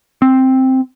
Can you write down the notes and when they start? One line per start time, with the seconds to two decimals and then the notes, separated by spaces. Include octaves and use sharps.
0.22 C4